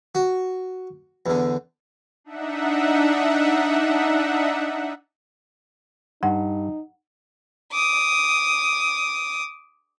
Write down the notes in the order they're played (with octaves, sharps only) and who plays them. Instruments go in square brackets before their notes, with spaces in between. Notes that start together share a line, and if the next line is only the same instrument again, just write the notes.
[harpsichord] F#4
E2 D3
[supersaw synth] D4 D#4 E5 F#5
[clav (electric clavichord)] G2 [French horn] D#4 [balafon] F#5
[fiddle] D6 D#6